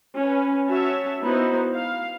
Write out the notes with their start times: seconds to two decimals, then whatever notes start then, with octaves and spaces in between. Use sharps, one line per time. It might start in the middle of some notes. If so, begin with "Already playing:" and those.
0.16 C#4 B4
0.67 C#4 F#4 C#5 E5 A5
1.20 B3 D#4 E4 F#4 C5
1.74 F5